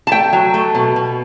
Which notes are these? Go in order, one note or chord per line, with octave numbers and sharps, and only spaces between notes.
A5
A3 G5
F#3
A3
B2
B2